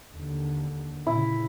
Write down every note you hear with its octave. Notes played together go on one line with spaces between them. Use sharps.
D#2 D3
A#2 C#3 E4